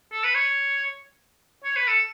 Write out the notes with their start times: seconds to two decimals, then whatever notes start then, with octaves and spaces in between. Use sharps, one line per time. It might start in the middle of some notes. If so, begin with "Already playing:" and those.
0.13 A4
0.24 B4
0.35 C#5
1.64 C#5
1.77 B4
1.88 A4